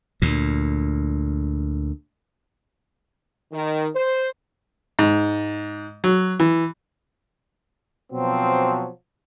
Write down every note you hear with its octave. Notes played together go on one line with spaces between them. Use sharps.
D2 A#2
D#3
C5
G#2
F#3
E3
B2 F3 F#3 C4